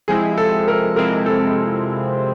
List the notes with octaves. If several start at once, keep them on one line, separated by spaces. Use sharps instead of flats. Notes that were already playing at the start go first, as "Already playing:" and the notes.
C3 F3 G#3 C4 E4 G#4
A4
A#4
C3 F3 G#3 C4 E4 A#4
A4